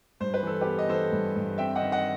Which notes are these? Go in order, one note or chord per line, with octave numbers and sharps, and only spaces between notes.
G2 C5
B4
E3 A4
B3 G4 B4
D#5
E3 A4 C5
G2
G2
C4 E5 G5
D#5 F#5
D#3
D#5 F#5